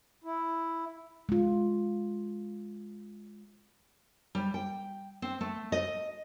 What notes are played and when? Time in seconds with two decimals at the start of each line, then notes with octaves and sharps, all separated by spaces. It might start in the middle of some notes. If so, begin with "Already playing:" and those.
0.24 E4
1.29 G#3 F4
4.35 G3
4.54 G5
5.22 C4
5.41 A3
5.72 D#5